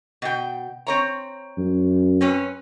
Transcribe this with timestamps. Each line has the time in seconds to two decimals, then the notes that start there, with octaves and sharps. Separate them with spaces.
0.22 B2 G5
0.87 C4 C#5 A#5
1.57 F#2
2.21 C4 C#4 B4